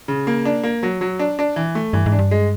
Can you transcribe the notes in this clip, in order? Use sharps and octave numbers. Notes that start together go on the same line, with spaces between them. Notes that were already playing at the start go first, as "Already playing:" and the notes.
C#3
A#3
D4
A#3
F#3
F#3
D4
D4
E3
A3
G2 E3
G#2
D4
G2
G#3